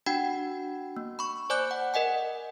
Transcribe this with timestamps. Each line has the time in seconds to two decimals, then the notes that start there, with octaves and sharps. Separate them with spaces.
0.06 D4 F#4 F#5 G5 B5
0.97 A#3
1.19 B5 C#6
1.50 C5 D5 G#5 D6 F#6 G6
1.71 F#5
1.94 A#4 D#5 F#5 G#5